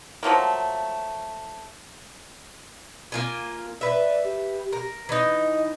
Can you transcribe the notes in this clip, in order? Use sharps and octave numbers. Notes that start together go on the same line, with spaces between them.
F3 F#3 A3 A#3
A#3 F4 G#5
B4 D5 E5
G4
A#4
E3 D#4 D#5